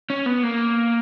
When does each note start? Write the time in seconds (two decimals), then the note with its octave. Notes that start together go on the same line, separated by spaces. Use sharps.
0.10 C#4
0.26 B3
0.43 A#3